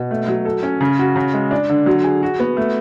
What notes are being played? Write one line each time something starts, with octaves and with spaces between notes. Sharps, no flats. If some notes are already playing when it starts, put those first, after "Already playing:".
Already playing: B2
A3
F#3
A4
C#4
C#3
F#4
C#3
G#3
D4
D3
F#3
G#4
F#4
B3
A3